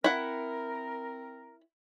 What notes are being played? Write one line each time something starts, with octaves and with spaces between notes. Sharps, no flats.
C4 E4 A#4 F#5